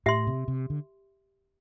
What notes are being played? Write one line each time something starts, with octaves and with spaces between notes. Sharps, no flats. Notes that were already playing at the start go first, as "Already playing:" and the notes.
A2 G4 E5 C6
C3
C3
D3